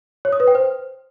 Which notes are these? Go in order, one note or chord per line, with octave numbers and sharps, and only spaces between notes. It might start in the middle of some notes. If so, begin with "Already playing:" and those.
C#5
D#6
B4
G5
C5